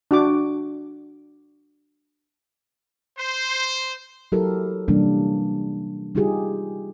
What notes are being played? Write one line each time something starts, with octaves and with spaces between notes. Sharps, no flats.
D4 F#4 D6
C5
F#3 E4 G4 A4 A#4
C3 E3 G3 A#3 C#4 D4
G3 D#4 F4 G4 G#4